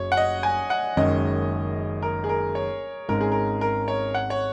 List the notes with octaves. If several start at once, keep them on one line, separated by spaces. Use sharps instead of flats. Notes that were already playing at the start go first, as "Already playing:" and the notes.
Already playing: F#1 F#2 F#3 C#5
F#5
D#5
G#5
F#5
F#1 F#2 D#3 G#3 C#4 D#5
A#4
G#4
A#4
C#5
G#1 G#2 G#3 C#4 A#4
G#4
A#4
A#4
C#5
F#5
C#5